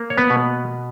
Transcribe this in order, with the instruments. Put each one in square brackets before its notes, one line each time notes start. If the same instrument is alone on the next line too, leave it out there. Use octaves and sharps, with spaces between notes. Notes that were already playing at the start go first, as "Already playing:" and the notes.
Already playing: [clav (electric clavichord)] A#3
C#5
B3 B4
B2